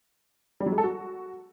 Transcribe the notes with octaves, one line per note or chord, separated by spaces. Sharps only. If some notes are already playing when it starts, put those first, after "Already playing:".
G3
F#3
G#3
A4
F#4